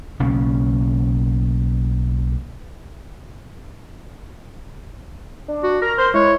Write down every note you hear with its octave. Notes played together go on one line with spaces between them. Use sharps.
B1 C#3 A#3 C#4
D4
F#4
A#4 A#5
C5 G6
G#3 E4 C#5